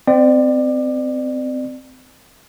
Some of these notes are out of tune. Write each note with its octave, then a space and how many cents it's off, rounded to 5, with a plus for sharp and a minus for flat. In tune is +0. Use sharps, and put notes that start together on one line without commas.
C4 -20 D5 +25